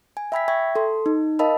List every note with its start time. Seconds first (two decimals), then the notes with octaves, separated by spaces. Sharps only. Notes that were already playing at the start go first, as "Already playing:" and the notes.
0.17 G#5
0.32 E5 G5 B5 E6 G#6 B6
0.48 E5 G5 C#6 G#6
0.76 A4 C6
1.06 D#4
1.39 A#4 D#5 F5 A5 B5 E6